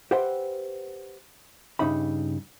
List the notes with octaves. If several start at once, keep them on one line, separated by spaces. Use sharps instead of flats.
G4 B4 C5 E5 F#5 G5
G2 C#3 D#4 E5 B5